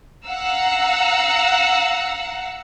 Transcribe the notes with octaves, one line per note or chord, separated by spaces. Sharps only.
F5 F#5 A#5 E6